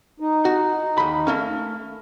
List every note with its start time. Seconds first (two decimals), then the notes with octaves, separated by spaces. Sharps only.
0.20 D#4
0.45 F#4
0.98 D#2 B5
1.27 A3 A#3 C#4